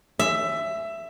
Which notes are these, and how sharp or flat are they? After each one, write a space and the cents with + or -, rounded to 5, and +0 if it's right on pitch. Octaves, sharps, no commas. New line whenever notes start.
E5 +15